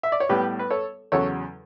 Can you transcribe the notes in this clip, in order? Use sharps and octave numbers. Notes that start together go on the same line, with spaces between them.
E5
D5
C#5
A2 G3 B3 G4 B4
B4
A4 C#5
E2 C#3 F#3 A4 C#5